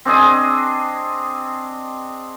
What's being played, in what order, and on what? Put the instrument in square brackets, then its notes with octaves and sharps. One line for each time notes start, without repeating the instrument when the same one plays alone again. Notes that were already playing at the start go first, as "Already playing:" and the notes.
[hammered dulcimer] C4 D4 G#4 D#5